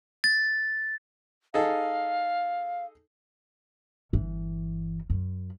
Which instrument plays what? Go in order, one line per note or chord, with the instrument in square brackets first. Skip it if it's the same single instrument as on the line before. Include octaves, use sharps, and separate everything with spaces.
[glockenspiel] A6
[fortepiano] D#4 G#4 A4 [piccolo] F5
[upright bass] G1 E3
F#2